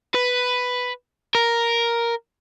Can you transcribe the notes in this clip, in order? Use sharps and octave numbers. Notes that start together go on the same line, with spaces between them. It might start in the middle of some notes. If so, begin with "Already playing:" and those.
B4
A#4